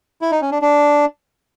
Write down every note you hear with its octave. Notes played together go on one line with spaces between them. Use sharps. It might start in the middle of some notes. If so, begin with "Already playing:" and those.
E4
D#4
C#4
D4
D4